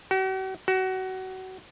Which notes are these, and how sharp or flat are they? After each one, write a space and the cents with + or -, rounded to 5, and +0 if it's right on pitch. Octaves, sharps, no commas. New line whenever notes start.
F#4 +45
F#4 +25